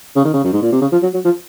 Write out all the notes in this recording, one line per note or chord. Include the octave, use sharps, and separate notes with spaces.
C#3
D#3
C#3
F#2
G#2
A#2
C3
C#3
F3
F#3
F#3
F3